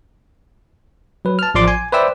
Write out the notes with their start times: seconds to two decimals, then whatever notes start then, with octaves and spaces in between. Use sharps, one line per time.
1.25 F#3 B4
1.39 A5 F6
1.54 A1 F3 D5 C6 D6
1.68 G#5
1.93 B4 C5 D5 E5 G5 E6